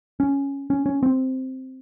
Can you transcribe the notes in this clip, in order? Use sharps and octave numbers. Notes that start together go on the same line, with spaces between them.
C#4
C#4
C#4
C4